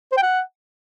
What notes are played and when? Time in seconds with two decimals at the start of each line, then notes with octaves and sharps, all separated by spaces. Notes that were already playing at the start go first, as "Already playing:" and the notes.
0.12 C5
0.17 G5
0.22 F#5